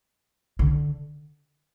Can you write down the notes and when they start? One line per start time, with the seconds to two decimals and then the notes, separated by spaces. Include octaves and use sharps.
0.59 D3